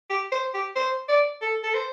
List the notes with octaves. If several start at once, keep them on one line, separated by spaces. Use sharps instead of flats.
G4
C5
G4
C5
D5
A4
A4
C5